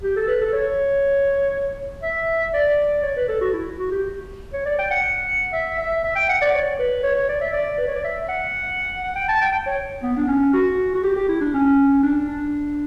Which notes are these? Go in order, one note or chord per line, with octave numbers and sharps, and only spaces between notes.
G4
A4
B4
A4
C#5
E5
D5
C#5
B4
A4
F#4
E4
F#4
G4
C#5
D5
G5
F#5
E5
E5
E5
G5
F#5
D5
C#5
B4
C#5
C#5
D5
E5
D5
B4
C#5
D5
E5
F#5
F#5
G5
A5
G5
G5
C#5
B3
D4
C#4
F#4
F#4
G4
G4
E4
D4
C#4
D4
D4